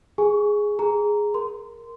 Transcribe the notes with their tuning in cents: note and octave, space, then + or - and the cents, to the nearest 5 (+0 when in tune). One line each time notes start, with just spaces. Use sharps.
G#4 +0 G#5 +5 C#6 +10
G#4 +0 A#5 +0
A#4 +0 C6 -15